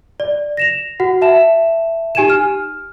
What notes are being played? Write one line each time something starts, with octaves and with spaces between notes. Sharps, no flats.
D5
A#6 E7 F7
F#4 F#5
E5 A5 E7
D#4 G4 G#5 G#6 D#7 E7
F6